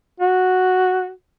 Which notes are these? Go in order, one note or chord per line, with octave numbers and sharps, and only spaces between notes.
F#4